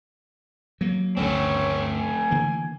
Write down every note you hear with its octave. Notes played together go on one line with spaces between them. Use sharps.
F#3 A#3
G1 D2 A3 C4 C#4
G#5
D3 E3 A#3